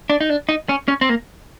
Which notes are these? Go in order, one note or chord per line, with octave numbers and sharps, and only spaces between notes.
D4
D#4
D4
D#4
C#4
C#4
C4
A#3